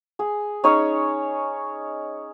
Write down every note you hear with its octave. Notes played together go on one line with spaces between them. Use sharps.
G#4
C#4 D#4 G#4 C#5